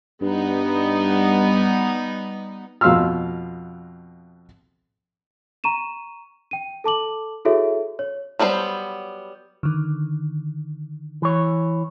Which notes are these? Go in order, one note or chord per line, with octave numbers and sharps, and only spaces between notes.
G2 G3 B3 D#4
F2 B2 F5 C6 E6 F6
A#5 C#6 D#7 E7
G5 D#7
A4 A5 D6 F#7
E4 F#4 G#4 A4 C#5 E5
C#5
F#3 G3 B3 A4 C5
D3 D#3
E3 C#5